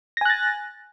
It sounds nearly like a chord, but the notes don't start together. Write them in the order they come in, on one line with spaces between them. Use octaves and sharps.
A#6 G#5 F#6 A6